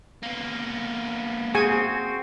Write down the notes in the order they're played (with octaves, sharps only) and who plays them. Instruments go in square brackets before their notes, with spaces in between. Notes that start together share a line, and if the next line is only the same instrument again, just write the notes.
[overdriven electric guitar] A#3 B3
[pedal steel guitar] C4 F#4 [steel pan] G#4 G#5